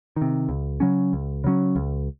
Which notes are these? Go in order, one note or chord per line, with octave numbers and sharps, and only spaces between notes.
D#3
C3
C#2
C#3 F#3 C#4
C#2
C#3 F#3 C#4
C#2